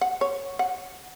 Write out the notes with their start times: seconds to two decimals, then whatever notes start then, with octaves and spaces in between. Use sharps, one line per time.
0.01 F#5
0.21 C#5
0.59 F#5